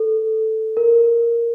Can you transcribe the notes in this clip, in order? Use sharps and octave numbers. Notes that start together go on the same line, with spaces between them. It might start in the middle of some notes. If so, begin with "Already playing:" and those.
Already playing: A4
A#4